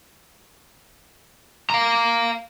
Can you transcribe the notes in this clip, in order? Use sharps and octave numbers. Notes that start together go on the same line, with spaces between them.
F5 A#5